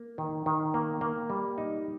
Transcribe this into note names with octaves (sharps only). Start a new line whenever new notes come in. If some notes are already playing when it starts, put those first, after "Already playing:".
Already playing: A#3
D#3
D#3
A#3
A#3
G3
D#4